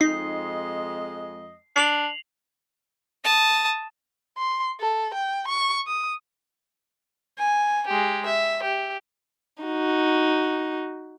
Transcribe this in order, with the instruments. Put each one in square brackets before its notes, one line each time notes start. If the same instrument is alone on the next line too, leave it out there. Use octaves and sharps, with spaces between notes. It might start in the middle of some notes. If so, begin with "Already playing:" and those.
[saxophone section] F2 G#3 D#5 [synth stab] D#4 [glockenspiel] C7
[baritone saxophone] D4 [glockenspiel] C7 F7 F#7
[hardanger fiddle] A5 D#6
[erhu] C6
A4
G5
C#6
D#6
[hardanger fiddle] G#5
G#3 G4
E5
G4
[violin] D#4 F#4